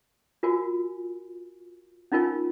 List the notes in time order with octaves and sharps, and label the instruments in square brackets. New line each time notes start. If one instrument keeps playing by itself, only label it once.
[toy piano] F4 F#4 A#4 G#5
C#4 D#4 F4 A#4 G#5